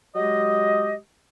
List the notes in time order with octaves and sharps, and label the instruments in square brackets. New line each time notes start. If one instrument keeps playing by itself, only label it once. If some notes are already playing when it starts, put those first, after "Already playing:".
[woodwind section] F#3 G#3 G4 D#5